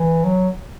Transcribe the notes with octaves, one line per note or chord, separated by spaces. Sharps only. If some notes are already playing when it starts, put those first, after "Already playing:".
Already playing: E3
F#3